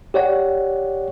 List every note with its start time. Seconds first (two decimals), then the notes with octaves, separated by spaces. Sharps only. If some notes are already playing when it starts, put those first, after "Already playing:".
0.14 G4 C#5 D5 F#5